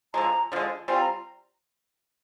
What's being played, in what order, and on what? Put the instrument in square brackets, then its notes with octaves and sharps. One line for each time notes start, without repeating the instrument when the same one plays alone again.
[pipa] D3 F3 G#3 [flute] A#5
[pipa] D3 F3 G#3
[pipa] G3 C4 F4 [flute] G#5
[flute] A#5